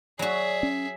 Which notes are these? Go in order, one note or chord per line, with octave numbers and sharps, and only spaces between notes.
F#3 F#4 G#4 D5 E5
C#4